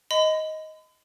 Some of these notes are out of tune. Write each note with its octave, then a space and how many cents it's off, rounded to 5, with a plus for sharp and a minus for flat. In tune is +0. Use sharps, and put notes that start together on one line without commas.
D#5 +10 B5 +45